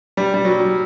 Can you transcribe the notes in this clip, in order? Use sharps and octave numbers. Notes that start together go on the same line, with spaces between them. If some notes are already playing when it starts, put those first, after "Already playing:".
G3
G3
F#3